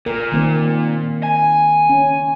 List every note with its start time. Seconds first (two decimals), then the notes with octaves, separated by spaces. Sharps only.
0.06 A#2 A#4
0.32 D#3 A#3 C4
1.23 G#5
1.89 C#4